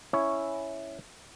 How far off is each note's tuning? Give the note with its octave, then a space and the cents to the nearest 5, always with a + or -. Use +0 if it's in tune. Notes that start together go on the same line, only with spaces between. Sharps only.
C#4 +0 E4 +0 C#5 +0